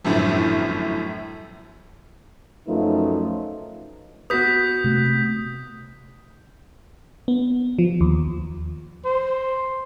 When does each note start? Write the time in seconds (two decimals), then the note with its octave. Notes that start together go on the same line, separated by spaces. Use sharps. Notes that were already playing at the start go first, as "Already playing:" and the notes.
0.05 G1 F#2 A2 F3
2.68 F#2 F3 A3 D#4 F4 B4
4.30 B3 F#4 B4 D#6 G6 B6
4.84 C3 A3
7.28 B3
7.79 F3
8.01 D#2
9.05 C5